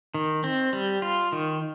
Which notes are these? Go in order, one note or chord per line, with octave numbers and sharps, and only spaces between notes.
D#3
C4
G3
F4
D#3